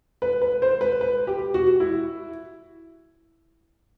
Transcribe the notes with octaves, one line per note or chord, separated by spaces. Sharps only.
B4
B4
C5
B4
B4
G4
F#4
E4